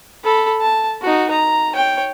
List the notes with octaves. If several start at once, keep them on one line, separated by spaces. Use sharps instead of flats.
A4 B5
A5
D#4 F#4
A#5
C#5 G5